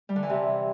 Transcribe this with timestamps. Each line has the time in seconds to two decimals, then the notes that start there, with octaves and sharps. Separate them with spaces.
0.09 G3
0.16 D3
0.23 E3
0.30 C3